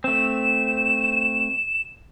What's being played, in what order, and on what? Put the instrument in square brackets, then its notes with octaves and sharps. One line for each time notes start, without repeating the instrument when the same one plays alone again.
[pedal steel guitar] A3 C4 [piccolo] E7